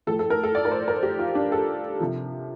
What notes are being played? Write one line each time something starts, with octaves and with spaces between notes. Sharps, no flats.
A2 F3 A4
A4
A#4
A4
D5
A#4
C5
A#4
G4
F4
D4
A4
C3 F3